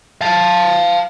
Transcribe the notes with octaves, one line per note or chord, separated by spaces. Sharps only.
F5 A5